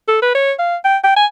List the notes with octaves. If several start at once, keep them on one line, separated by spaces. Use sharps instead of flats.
A4
B4
C#5
F5
G5
G5
G#5